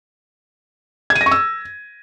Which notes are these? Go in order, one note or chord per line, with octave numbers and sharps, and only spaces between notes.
G#6
D#7
A#6
C#6
E6